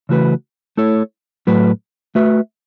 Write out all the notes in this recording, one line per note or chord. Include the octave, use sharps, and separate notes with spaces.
C#3 E3 A3 F#4 B4
A3 E4 A4 C#5
A2 F#3 A3 F#4 B4
A3 F#4 B4 E5